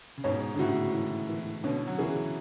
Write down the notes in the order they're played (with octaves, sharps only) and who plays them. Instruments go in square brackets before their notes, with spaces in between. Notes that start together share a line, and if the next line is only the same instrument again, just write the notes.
[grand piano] C#3
[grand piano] G#2 B2 [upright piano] C#5
[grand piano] D3
[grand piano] A2 C#3 [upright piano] F#4
[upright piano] E3
E3
[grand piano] B2 D3 [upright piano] C#4
[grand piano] F#3
[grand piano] C#3 E3 [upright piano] G#4